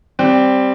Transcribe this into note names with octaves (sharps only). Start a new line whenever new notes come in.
G3 C4